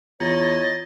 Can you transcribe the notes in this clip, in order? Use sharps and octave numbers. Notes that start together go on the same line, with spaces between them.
E2 F4 C#5 D#5 A6